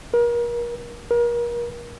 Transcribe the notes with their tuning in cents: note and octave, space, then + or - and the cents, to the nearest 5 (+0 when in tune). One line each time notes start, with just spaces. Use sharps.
A#4 +35
A#4 +35